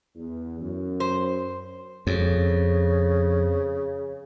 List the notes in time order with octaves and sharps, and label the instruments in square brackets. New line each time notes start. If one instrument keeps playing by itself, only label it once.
[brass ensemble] E2
F#2
[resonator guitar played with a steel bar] C5
[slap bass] F2 [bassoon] C#3